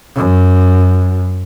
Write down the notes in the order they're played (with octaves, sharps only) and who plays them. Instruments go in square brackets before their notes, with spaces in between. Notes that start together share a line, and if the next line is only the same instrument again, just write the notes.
[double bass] F#2